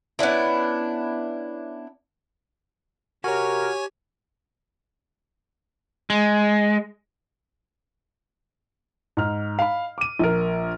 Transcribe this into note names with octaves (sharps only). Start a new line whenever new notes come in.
B3 C#4 D4 E4
C3 F#4 G4 A#4 C#5 G#5
G#3
G#2 F6
F5 B5
D6 D#7
A#1 A#4